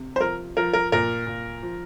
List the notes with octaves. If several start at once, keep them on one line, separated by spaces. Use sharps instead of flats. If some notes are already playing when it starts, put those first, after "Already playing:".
Already playing: C3
C5
F3 A#4
F3 A#4
A#4
A#2 A#4
A#2
F3